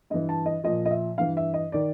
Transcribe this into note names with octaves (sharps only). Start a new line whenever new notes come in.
G2 E3 D#5
A5
D#5
A#2 F3 D#5
D#5
E5
G2 E3 F5
E5
D#5
D#3 D5